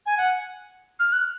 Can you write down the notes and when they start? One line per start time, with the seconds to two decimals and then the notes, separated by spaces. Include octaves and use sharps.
0.06 G#5
0.18 F#5
1.00 F6
1.13 F#6